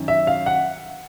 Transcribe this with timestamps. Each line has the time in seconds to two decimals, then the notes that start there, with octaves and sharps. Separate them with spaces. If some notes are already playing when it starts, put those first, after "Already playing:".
Already playing: F#2 D#3
0.08 E5
0.27 F5
0.46 F#5